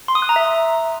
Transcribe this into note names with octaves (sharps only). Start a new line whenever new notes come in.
C6
D#6
F#6
A#5
E5